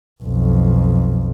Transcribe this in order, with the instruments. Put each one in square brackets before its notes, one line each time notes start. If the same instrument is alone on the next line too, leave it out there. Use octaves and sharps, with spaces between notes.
[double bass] B1 F2